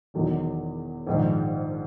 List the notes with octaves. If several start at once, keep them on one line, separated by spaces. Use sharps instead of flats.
E1 E2 D#3 F#3
A#1 G#2 D#3